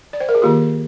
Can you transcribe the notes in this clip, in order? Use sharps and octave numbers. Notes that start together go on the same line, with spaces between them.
D5
C5
A#4
G#4
D#3 A#3 F4 G4